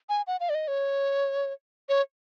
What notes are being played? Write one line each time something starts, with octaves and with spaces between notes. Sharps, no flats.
G#5
F#5
F5
D5
D#5
C#5
C#5